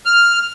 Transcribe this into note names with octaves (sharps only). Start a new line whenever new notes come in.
F6